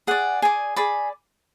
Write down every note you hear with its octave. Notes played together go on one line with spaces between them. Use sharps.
G#4 D5 F#5
G#4 D5 G#5
G#4 D5 B5